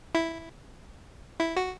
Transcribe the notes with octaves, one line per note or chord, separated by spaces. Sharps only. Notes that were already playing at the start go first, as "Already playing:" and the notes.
E4
E4
F#4